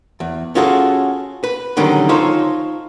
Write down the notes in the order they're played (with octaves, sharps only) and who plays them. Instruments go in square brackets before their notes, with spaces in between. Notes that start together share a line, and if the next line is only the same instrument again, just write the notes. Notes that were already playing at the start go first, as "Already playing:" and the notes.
[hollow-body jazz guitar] E2
C#4 F4 F#4 G#4 A4
B4
D3 D#3 F#3 G3 C#4
D#4 F4 A4 C5 C#5